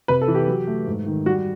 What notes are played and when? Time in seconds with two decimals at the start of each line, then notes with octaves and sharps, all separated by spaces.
0.08 C3 B4
0.21 A4
0.28 E3
0.35 G4
0.48 F#3
0.67 A3
0.87 G#2
1.07 D#3
1.26 G3 F#4